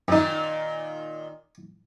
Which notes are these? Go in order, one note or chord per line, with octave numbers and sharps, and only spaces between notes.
F#2 A#2 D#3 D#4